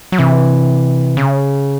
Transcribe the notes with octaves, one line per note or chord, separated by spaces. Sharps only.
F#3
C3 E3
C#3